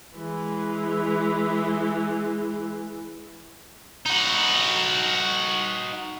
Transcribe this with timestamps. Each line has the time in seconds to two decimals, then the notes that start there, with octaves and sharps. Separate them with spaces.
0.18 E3 G#3
4.06 D#4 F#4